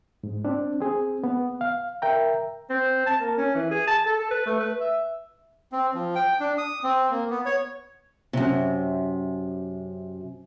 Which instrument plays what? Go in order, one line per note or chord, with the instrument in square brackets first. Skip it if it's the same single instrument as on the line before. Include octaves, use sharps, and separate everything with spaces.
[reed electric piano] G#2
C4 D4
C4 G#4
B3
F5
A#4 E5 G5 A#5
[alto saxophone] C4
A5
A#3
C#4
E3
G#4
A5
A4
B4
A3
B4
E5
[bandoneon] C4
F3
G5
D4
D#6
C4
A#3
B3
C#5
[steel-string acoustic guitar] F#2 C3